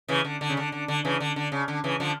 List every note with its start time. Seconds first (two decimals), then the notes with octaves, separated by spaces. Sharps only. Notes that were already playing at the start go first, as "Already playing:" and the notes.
0.08 C#3 E3
0.25 D3
0.41 D3
0.49 C#3
0.57 D3
0.72 D3
0.88 D3
1.05 C#3 E3
1.20 D3
1.36 D3
1.52 C#3
1.68 D3
1.84 C#3 E3
2.00 D3 F3